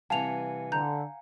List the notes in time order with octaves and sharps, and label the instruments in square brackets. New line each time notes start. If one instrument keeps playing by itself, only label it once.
[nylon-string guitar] C3 E3 G3 [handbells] F5 F#5 G#5 [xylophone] A5 F7
[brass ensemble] D3 [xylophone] A#5 G6